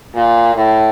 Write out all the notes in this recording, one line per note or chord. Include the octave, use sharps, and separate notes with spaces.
A#2
A2